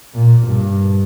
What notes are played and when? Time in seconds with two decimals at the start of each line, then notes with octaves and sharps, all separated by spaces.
0.14 A#2
0.47 G2